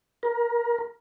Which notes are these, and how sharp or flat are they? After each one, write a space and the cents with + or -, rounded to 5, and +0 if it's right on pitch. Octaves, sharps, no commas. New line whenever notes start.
A#4 +25